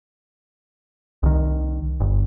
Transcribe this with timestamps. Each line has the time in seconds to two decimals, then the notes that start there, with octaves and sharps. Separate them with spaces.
1.23 C2 D#3
2.00 G1